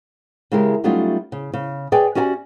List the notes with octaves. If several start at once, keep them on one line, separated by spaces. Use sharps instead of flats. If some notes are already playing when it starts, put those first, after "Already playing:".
C#3 G#3 E4 G4 A#4
F#3 G3 A3 C#4 D#4 F4
C#3
C#3
G#4 B4 C#5 D5 G5 G#5
C#4 F#4 G4 D5 F#5 G#5